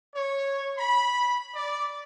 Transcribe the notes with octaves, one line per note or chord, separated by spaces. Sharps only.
C#5
B5
D5